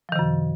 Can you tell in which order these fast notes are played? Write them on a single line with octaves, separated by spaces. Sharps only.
F3 D#3 C3 F#2